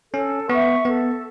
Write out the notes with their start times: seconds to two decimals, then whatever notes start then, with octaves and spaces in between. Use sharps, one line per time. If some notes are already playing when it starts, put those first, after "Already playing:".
0.13 C#4 A4
0.49 B3 E5 C#6
0.85 B3 A4